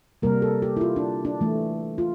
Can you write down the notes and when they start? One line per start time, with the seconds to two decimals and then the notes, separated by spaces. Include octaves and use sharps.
0.22 C3 G3 A#3 A#4
0.42 A4
0.62 G4
0.77 E4
0.81 F4
0.96 D4
1.25 D4
1.41 E3 A3
1.98 F4